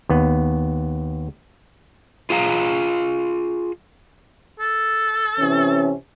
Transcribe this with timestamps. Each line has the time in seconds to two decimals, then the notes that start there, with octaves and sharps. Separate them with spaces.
0.09 D#2 B3
2.30 F4 G#4 F5 A#5
4.60 A4
5.39 C3 E3 C#4